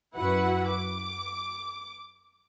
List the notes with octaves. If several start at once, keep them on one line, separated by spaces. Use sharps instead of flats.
F#2 E4 F#4 B4 F#5
D6